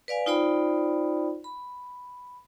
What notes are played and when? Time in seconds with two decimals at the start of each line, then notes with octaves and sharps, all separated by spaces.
0.08 B4 D5 F5 G#5
0.26 D#4 F4 C5 D5 G5 B5
1.44 B5